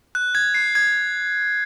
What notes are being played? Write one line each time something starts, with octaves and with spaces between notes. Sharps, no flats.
F#6
G#6
C7
G#6